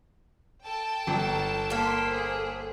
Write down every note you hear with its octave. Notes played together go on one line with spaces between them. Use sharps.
A4 G5 A5
G1
A#3 A4 C6 B6
G#4 C5